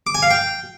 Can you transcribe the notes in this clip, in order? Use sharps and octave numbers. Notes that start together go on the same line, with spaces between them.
D6
G#5
F5
G5